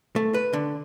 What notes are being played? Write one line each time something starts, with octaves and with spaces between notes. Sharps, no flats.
A3
B4
D3